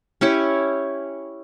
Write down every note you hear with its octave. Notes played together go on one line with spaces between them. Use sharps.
C#4 E4 G4 C#5